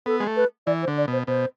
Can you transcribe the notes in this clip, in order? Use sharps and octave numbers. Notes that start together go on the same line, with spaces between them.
B3 A4
G#3
A3
B4
E3 D5
C5
D3
D5
B2 C5
B2 C5